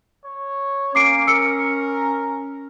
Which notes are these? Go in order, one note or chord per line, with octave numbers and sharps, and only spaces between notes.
C#5
A#3 C#4 D6 C7 D7
A#4 E6 C#7